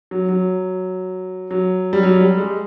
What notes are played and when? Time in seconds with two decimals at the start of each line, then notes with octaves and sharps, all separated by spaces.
0.11 F#3
0.29 F#3
1.51 F#3
1.93 G3
2.03 F#3
2.21 G3
2.38 G#3